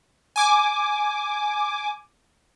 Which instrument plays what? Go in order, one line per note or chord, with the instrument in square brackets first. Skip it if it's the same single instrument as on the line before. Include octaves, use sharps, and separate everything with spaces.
[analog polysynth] G#5 D6